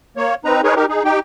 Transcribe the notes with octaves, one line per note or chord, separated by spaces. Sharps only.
A#3 C#5
C4 D#4 B4 A#5
D#4 G#4 A#4 B4 C#5
D#4 G4 A#4
D#4 G#4
D#4 G4 G5